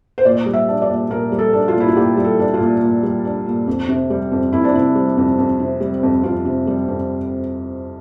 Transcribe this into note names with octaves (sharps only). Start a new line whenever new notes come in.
C5
A#2 D5
G3
E5
D4
D5
A#2
A#2 A#4
G3
A4
D4
F4
A#2
E4
F4
A#2 G4
G3
A4
D4
F4
A#2
A#2
G3
D4
A#2
F2
C3
G3
F2
F2 E4
D4
C3 E4
G3
F2
F2
C3
G3
F2
F2 F4
C3
G3
F2